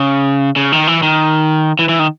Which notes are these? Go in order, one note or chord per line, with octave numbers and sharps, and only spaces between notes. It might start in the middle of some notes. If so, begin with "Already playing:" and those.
Already playing: C#3
C#3
D#3
E3
D#3
E3
E3
D#3